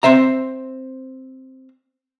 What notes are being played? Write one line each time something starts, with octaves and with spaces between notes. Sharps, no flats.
C4 C5 E5 A#5